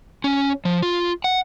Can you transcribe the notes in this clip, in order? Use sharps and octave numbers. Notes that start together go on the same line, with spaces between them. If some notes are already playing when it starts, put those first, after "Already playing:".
C#4
F3
F4
F#5